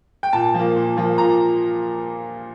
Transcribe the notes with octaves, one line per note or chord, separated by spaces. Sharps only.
G5
A#2 A5
F3 A#3
A#2
F3 A#3
A#2 A#5